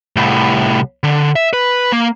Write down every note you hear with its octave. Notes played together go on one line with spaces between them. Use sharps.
C2 A2
D3
E5
B4
A#3